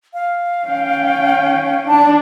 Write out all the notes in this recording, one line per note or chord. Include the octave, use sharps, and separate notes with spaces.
F5
C#4 G5
D4 A5